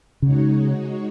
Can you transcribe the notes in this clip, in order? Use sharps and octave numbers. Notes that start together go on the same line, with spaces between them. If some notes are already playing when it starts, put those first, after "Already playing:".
C#3 G#3 D#4 F#4 C#5